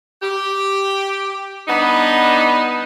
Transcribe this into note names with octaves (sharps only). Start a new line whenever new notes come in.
G4
G3 B3 D4 D#4